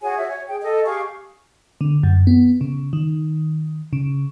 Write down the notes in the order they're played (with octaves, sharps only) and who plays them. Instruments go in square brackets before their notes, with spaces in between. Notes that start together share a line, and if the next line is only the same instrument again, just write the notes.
[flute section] F#4 G#4 C#5 G#5
F#4 E5
C#5
G#4 G5
A4 D#5
G4 G#4 F5 C#6
[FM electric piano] D3
F#2
B3
C#3
D#3
C#3